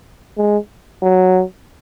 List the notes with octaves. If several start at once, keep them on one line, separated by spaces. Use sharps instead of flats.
G#3
F#3